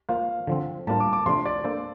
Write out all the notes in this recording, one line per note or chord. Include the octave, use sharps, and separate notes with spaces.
A#3 F4 C5 F5
D3 F3 C4
A2 G3 A#3 D4 F4 A5
D6
D6
C3 F3 A3 D4 F4 C6
D5
A#3 D4 A4 C5